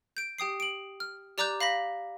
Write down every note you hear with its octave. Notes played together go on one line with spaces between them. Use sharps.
G6 D7
G4 G5 D#6 C7
D7 F#7
F6
G4 D5 A#5 D6 F#6 G6
F5 B5 A#6 B6